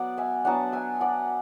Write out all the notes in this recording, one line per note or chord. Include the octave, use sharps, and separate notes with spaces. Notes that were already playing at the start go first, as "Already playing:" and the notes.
Already playing: F#3 B3 D5 F#5
E5 G#5
F#3 B3 D4 F#5 A5
E5 G#5
D5 F#5